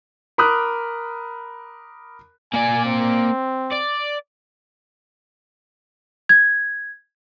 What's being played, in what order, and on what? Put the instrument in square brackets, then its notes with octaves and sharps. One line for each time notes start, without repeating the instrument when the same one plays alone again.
[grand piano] A#4 B5 D6 D#6 F#6
[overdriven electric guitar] A#3 D5 [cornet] G#5
[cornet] C4
[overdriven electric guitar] D5
[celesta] G#6